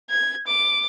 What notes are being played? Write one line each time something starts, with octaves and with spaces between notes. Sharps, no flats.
G#6
D6